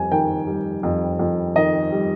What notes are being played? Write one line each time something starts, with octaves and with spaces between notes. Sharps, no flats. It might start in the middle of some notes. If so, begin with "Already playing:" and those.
Already playing: F2 G3 G#5
D#3 G5
G3
F2
F2
D#3 D#5
G3